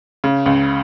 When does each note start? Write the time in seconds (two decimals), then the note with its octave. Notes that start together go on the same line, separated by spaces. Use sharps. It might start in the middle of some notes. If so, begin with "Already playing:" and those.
0.24 C#3
0.46 C#2